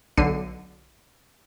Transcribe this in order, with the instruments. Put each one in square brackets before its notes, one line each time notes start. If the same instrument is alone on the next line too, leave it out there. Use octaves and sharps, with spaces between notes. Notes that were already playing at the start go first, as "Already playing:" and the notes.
[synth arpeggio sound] B1 D3 C7 D#7